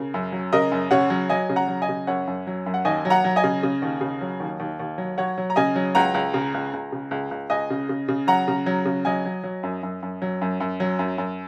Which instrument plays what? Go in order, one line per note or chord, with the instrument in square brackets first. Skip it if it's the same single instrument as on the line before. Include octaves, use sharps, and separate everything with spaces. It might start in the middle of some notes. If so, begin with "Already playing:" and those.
Already playing: [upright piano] C#3 A#4
F#2
F#3
C#3 A#4 D#5
F#2
C#3 C#5 F#5
F#3
F#3 D#5 G#5
C#3
F#5 A#5
F#3
D#5 G#5
C#3
F#2 C#5 F#5
F#2
F#3
F#2
F#5
D#2 D#5 G#5
F#3
F#5 A#5
F#3
D#5 G#5
C#3
C#3
D#2
C#3
F#3
D#2
D#2
D#2
F#3
F#3 C#5 F#5
F#3
A#5
C#3 D#5 G#5
F#3
C#2 F#5 A#5
C#2
C#3
C#2
C#2
C#3
C#2
C#2
C#2 D#5 G#5
C#3
C#3
C#3
F#3 F#5 A#5
C#3
F#3
C#3
F#3 D#5 G#5
F#3
F#3
F#2
F#2
F#2
F#3
F#2
F#2
F#3
F#2
F#2